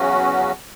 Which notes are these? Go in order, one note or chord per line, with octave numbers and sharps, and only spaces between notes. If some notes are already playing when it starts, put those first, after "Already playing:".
Already playing: E2 C#3 F#3 C#4 F#4